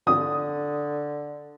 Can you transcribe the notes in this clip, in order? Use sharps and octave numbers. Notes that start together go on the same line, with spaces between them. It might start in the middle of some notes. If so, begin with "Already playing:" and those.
D3 D#6